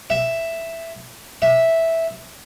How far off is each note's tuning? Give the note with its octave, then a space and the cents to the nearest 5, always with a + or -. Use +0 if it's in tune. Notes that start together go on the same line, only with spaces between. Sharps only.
E5 +5
E5 -5